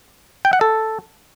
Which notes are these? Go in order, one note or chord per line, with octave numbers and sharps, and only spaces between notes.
G5
F#5
A4